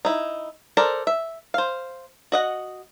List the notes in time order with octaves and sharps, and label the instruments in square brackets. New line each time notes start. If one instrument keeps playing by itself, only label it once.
[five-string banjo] D#4 E4
A4 A#4 C5 D5
E5
C5 F5
F#4 D#5 F#5